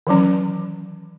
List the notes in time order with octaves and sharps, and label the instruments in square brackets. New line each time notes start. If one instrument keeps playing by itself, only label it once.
[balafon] D#3 E3 F#3 C#4